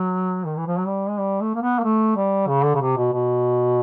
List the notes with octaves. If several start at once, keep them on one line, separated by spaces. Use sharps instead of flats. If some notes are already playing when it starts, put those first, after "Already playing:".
Already playing: F#3
D#3
E3
F3
F#3
G3
G#3
G3
A3
A#3
B3
A#3
A3
G3
C#3
D3
C#3
C3
B2
B2